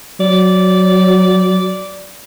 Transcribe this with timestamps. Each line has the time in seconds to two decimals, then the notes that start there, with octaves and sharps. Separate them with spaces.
0.20 F#3 D5